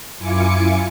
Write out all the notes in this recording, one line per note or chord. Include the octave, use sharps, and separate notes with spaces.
F#2 E4 F4 G#5 D6 C#7